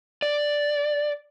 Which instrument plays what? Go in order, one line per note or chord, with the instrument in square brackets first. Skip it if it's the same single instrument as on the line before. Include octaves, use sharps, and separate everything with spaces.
[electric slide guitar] D5